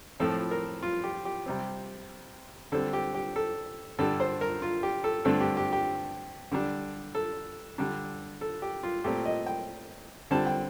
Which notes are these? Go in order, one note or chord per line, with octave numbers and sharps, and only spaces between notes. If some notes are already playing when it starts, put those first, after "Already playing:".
A2 F3 C4 A4
A#4
F4
G4
G4
C3 G3 C4
D3 G3 C4 A4
G4
G4
A4
G2 D3 G3 A4
C5
A#4
F4
G4
A4
G2 D3 A3 C4 A4
G4
G4
G4
D3 G3 D4
A4
D3 G3 D4
A4
G4
F4
A#2 A3 C4 G4
D#5
G5
D3 G3 C4 A5
G5